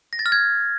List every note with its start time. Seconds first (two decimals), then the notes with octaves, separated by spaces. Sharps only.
0.13 A#6
0.19 A6
0.26 F6
0.32 G#6